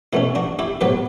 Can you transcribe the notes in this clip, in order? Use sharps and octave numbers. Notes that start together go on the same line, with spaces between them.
B2 A3 C#4 E4
D4 F#4
E4 G4
A2 F#3 B3 G4 B4